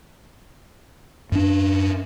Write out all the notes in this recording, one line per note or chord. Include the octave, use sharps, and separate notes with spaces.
F#2 D4